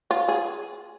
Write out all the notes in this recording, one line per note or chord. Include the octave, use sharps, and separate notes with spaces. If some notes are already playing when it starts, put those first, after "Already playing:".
F4
G#4